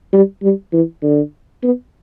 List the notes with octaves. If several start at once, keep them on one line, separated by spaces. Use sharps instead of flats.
G3
G3
E3
D3
B3